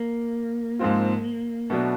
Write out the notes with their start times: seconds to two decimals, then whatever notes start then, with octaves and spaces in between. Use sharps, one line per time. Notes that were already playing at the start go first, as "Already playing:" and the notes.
Already playing: A#3
0.79 G#2 F3 G#3 C4 F4
1.70 B2 F#3 A3 B3 D4